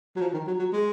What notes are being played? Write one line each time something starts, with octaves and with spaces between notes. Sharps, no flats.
F#3
F3
D#3
F#3
F#3
G#3